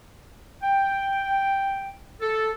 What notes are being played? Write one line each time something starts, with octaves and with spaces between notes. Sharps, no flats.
G5
A4